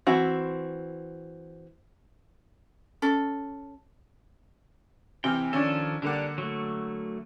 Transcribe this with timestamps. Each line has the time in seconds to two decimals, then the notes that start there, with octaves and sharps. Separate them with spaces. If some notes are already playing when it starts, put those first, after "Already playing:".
0.07 E3 C4 F#4
3.02 C#4 A4
5.24 C3 E3 G5 F6
5.53 D#3 F3 C#4 D4 A4
6.02 D3 G3 A#3 D4 F#5
6.38 F#3 A3